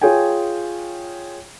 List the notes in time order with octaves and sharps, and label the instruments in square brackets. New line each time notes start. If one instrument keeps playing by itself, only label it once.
[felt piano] F4 G#4 C#5 G5 G#5